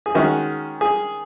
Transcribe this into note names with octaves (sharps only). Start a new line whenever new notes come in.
G#4
D#3 G#3 C#4 F#4
G#4